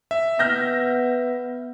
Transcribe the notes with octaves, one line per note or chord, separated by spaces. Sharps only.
E5
B3 F6 G6 A#6